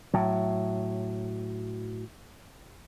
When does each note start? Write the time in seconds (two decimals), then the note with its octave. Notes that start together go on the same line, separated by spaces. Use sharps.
0.14 A2 F#3